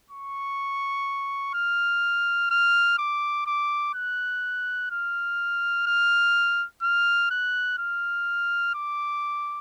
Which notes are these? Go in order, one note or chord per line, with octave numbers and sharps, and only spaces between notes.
C#6
F6
F6
D6
D6
F#6
F6
F6
F6
F#6
F6
D6